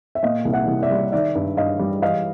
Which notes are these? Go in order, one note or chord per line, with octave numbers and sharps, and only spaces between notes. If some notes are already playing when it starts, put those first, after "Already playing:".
E5
A#2 D#5 F5
C2
E5 F#5
C2
D5 E5
G3
D#3 D5 E5
G2
G2 D#5 F5
G3
E3 D#5 F5